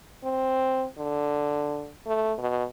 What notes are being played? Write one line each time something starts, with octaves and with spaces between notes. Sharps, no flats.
C4
D3
A3
B2